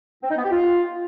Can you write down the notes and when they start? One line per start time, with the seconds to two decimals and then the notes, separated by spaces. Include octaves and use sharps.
0.23 C4
0.30 D#4
0.37 B3
0.44 G4
0.51 F4